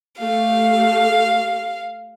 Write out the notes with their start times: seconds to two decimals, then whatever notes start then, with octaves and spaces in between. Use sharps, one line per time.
0.19 A3 G4 F5